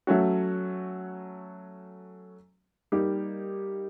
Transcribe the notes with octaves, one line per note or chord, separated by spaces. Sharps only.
F#3 A3 C#4 F#4
G3 A#3 D#4 G4